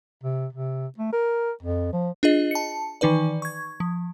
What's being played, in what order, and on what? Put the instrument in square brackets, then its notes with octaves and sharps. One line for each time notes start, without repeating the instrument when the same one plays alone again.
[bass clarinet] C3
C3
A3
A#4
F2
F3
[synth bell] D4 F4 G#4 D#5
A5 C#7
D#3 E3 D#4 B4 D5
C#6 G#6
F3